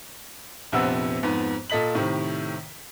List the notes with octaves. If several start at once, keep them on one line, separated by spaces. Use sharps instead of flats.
A#1 F2 C3 B3 F#5 E6
F2 G#2 B3
A#2 A4 D#5 B6 F#7
A2 C3 D#3